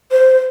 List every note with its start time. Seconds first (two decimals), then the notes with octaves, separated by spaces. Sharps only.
0.12 C5